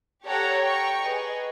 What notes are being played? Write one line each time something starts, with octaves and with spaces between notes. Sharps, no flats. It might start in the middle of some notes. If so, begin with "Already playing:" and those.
G4 A4 C#5 F#5 G5 A#5
G5 A#5 C#6
G#4 B4 D#5